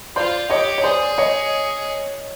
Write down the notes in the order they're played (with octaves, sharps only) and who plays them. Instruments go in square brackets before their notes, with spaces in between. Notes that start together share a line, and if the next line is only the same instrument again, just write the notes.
[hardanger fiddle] F4 [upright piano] C5 D5
[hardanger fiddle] G4 [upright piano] C#5 D#5
[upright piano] C#5
[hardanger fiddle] G#4 [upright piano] C5 D5
[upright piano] C#5 D#5